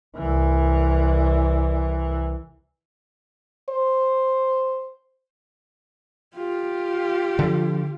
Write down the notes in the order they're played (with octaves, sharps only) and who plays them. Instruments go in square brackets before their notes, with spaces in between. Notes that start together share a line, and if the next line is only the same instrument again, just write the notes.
[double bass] C2 E3
[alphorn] C5
[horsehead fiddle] F4 G4
[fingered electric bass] D3 F3